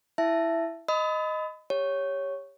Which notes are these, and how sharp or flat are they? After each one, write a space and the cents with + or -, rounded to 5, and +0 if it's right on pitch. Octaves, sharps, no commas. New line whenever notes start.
E4 +0 E5 +15 A5 +0
D#5 +0 B5 +30 D#6 +35
G4 +20 C#5 +0